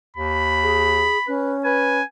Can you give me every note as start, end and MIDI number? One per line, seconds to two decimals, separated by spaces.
0.17 1.10 39
0.17 1.36 83
0.63 1.18 68
1.27 2.02 61
1.27 1.54 71
1.65 2.00 71
1.65 2.04 80